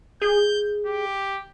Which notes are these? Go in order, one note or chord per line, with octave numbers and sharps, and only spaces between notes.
G#4 G6
G4